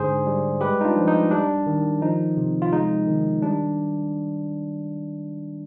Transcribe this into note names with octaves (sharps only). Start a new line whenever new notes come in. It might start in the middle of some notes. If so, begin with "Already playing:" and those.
Already playing: G#2 D3 G#4 C5
G3
G#3 G4 B4
D#4
D4 F4
F3
D#4
G3 D4
D#3
F3 D#4
C3
F4
G#3 D#4
D#3
G3 D4